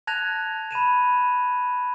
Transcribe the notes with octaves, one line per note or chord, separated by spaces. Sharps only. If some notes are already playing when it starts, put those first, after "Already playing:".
A5 F#6 G#6 A#6 F7
B5 G#6 D#7 E7